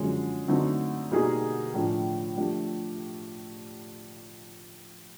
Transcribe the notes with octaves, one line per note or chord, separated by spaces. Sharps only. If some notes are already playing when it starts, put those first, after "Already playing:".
Already playing: F#2 D3 F3 G#3 C#4
D3 F#3 A3 C4 D#4
B2 G3 A#3 D#4 G#4
A2 F3 A3 D4
F3 A3 D4 G4